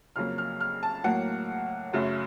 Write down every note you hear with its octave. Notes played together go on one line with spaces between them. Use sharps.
F2 C#3 F#3 A#3 F6
F6
F6
A5
A2 F#3 A#3 F#5
F#2 C#3 F#3 A3